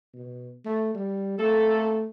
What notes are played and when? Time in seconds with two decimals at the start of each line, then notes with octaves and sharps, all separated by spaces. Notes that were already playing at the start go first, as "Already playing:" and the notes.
0.14 B2
0.65 A3
0.95 G3
1.39 A3 A#3 C4 A4